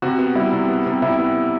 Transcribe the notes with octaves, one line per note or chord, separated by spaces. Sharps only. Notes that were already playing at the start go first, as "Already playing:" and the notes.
C3 F#4
B3
G3 E4
C3
B3
C3
C3 E4
B3